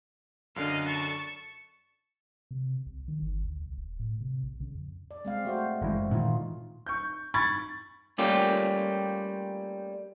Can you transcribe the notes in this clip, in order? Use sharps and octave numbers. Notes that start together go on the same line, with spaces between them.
F#2 D3 D4 D#5 F5
A5 C#6
C3
C2
D#3
G1
D2
C2
E1
A2
C3
B1
C#3
F2
D5
G#3 C4 F5
A3 F#4 C5
F#1 E3 G#3
A#2 D#3 E3 D#4 F4
C#6 G6
B5 C#6 G#6 A6
G3 A3 A#3 C#4 F4 G4